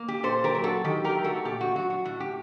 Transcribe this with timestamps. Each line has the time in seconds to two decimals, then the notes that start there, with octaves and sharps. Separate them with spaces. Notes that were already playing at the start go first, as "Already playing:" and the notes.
Already playing: A#3
0.08 G4
0.23 A#2 A4 C5
0.44 G4 A#4
0.54 F#3
0.64 F#4 A4
0.84 D#3 G4
1.04 G4 A#4
1.15 A3
1.24 F#4 A4
1.45 A#2 G4
1.61 F#4
1.75 F#3 F#4
1.90 F#4
2.05 A2 F#4
2.20 G4